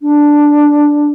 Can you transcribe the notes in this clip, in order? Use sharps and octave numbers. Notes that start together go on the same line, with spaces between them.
D4